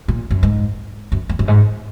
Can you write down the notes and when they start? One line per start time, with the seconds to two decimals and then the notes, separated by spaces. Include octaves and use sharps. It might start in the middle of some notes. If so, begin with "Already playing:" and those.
0.08 A#2
0.31 F#2
0.43 G#2
1.12 F#2
1.29 F2
1.39 F#2
1.48 G#2